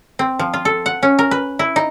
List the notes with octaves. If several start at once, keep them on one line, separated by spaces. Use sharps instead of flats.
C4
F3
F4
A4
F#5
C#4
A#4
B4
E4
D#4